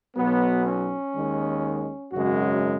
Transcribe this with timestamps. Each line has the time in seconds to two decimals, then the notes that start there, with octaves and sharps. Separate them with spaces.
0.16 B1 B2 F#3 B3
0.66 C#4
1.14 D#2 D#3 G#3
2.12 G#1 F#2 C#3 G#3 F#4